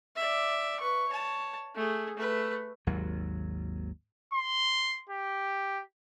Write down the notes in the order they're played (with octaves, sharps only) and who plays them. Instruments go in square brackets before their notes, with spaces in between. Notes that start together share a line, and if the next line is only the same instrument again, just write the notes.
[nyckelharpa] D5 E5
B4 C#6
C#5 A5
A3 G#4
A3 B4
[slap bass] G#1 D#2 F#3
[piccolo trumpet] C6
G4